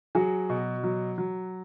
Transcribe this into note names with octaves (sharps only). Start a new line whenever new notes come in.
F#3 F#4 G#4
B2
F#3
F#3